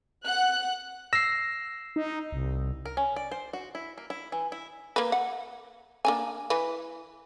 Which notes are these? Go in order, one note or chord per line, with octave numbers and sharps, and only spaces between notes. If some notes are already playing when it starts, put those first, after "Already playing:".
F#5 F#6
E6 A#6 C7
D#4
C2
A#4
C#4
D5
C5
F#4
E4
A#3
E4
E3
E4
A#3 B4
F#5
A#3 D4 G#5
E3 B4